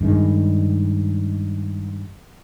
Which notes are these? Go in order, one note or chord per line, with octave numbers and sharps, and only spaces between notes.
G2 D#3 G#3